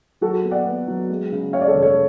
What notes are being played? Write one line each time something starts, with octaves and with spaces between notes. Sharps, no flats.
F#3 F#4 A4
B3
D5 F#5
B3
F#3
G#3
C#3
G#3 C#5 F5
D5
A4 C#5
F1
A4 C#5